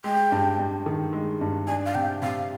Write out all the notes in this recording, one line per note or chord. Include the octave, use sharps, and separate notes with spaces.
G#3 G5
G2
G2
D#3
G#3
G2
D4 G#5
F5
C3 G5
C3 F5